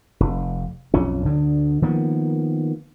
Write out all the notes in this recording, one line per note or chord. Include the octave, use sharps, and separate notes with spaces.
F1
B1 F2 C#4
D2 D3
D#3 F3 A#3 B3